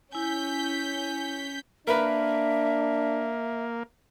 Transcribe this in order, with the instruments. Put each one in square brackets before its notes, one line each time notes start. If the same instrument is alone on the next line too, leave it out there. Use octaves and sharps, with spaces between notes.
[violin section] C#4 G6 B6 [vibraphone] E4 G#5
[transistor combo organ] A#3 [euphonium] D4 [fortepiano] A#4 B4 [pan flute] E5